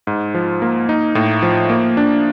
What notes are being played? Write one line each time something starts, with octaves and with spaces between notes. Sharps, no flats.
G#2
F3
A#3
D#4
A2
F3
A#3
D4